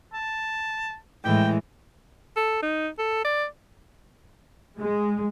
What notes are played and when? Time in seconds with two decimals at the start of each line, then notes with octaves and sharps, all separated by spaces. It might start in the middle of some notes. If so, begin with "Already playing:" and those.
0.13 A5
1.25 A2 E3 G#3 G5
2.36 A4
2.62 D#4
2.98 A4
3.25 D5
4.78 G#3